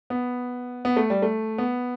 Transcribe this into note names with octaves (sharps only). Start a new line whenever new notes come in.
B3
B3
A3
G3
A3
B3